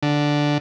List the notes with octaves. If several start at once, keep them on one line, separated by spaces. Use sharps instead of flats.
D3